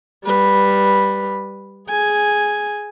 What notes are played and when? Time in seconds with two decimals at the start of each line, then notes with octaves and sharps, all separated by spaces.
0.25 G3 B4
1.89 G#4 G#5